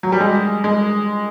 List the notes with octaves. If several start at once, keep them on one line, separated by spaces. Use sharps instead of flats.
F#3
G3
G#3
G#3